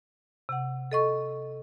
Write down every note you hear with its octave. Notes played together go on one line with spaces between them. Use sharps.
C3 F#5
A4 D#5 C#6